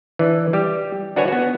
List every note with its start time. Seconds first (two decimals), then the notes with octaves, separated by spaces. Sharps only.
0.19 E3 D4
0.53 G3 G4
1.16 D4 F#4 B4 C#5 G#5
1.28 B3 F#4